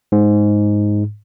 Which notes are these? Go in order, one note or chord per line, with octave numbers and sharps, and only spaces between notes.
G#2